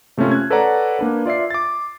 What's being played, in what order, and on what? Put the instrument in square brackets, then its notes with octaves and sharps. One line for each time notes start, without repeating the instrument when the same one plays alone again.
[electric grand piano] C3 A3 A#3 C#4 F4
F#6 G#6
A4 B4 C#5 D5 F#5 A#5
A#3 D4 B4
F4 D5 E5 C7
D6 A6